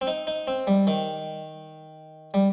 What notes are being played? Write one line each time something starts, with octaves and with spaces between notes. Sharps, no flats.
C4
D#4
D#4
C4
G3
D#3
G3